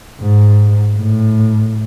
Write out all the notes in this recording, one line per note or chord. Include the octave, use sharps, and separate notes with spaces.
G#2
A2